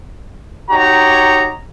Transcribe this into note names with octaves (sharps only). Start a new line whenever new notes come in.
D#4 F#4 G4 C#5 A#5